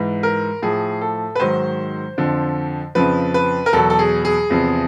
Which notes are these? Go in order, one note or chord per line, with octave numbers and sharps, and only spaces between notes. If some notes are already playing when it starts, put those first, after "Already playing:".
Already playing: G#2 E3
A#4
A2 F3 G#4
A4
B4
G#2 D#3 F#3 C5
F2 D3 F3
F2 C#3 F3 B4
B4
A#4
E2 B2 F#3 A4
A4
G#4
G#4
E2 C3 F3